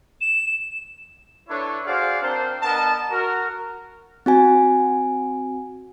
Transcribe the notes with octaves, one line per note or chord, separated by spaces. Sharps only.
E7
D4 E4 A4 B4 C#5
F#4 G#4 C5 D5 F5
C4 D4 A#4 C5 F5 A5
B3 D4 A#4 D#5 A5
F#4 A#4
C4 F#4 G#5